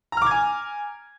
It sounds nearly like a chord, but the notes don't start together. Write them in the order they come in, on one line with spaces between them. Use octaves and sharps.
A#5 F6 D6 G#6 G#5